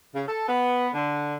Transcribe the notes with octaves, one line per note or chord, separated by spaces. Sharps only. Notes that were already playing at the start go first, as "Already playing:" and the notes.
C#3
A4
B3
D3